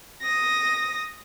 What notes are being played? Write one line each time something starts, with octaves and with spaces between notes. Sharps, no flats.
D#6 A#6